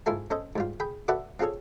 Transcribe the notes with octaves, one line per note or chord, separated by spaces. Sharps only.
G#2 E4 F4 A4 G#5
C#4 A4 C5 D#5
G#2 G3 F4
G#4 G5 B5
F#4 A4 B4 D5 E5 F#5
C4 F4 G#4 A4 C#5